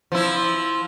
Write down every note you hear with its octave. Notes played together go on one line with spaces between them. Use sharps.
F3 E4